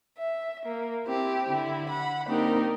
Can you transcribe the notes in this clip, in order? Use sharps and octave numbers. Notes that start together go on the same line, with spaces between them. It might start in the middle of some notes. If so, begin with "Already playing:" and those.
E5
A#3
C4 E4 G4
D3 E4
F#5 B5
A#3 C4 D4 D#4 G4 A#4